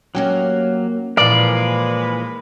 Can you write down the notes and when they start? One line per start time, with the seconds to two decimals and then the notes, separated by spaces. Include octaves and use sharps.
0.15 F#3 A#3 C#4 G4
1.17 A#2 E3 F3 G#3 A#4 B4 D5 F5